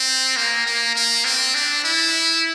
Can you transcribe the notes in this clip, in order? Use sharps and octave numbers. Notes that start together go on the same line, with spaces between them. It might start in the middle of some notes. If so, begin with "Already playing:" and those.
Already playing: C4
A#3
A#3
A#3
C4
D4
E4